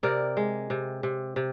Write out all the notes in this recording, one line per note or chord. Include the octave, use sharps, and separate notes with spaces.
C3 A#4 D5
G#3
C3
C3
C3